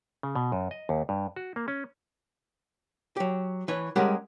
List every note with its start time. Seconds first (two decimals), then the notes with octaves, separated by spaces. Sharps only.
0.23 C#3
0.35 B2
0.52 F#2
0.71 D#5
0.89 D#2
1.09 G2
1.36 F#4
1.56 A#3
1.68 C#4
3.17 F#3 G4
3.68 E3 B4 C#5
3.96 G3 G#3 C#4 G4 A#4 F#5